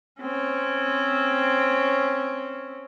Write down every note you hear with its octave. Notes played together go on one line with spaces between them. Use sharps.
C4 C#4